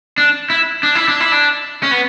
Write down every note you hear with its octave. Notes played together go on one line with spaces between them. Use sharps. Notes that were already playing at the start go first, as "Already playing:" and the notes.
D4
E4
D4
E4
D4
E4
D4
C#4
B3